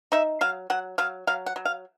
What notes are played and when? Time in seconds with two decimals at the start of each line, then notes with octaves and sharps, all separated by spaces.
0.12 D#4 E5
0.41 F#3 F5
0.70 F#3 F#5
0.98 F#3 F5
1.27 F#3 F5
1.46 F#5
1.56 F#3
1.65 F5